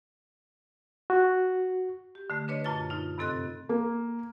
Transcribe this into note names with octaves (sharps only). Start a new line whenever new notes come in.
F#4
G4
D3 A3
D4 B4 C#5 D#5
F#2 A#2 F4 A5 A6
D#4 F4
G2 C3 C4 A4 D#5 F#6
A#3